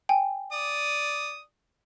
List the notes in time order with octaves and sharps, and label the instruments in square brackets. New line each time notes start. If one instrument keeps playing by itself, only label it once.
[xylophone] G5 G#5
[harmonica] D5 D#6